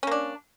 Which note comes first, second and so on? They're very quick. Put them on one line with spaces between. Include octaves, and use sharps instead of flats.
C#4 A#3 D4